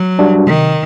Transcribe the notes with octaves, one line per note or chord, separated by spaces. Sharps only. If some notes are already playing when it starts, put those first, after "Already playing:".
Already playing: F#3
G3 D4 F#4
C3 D#3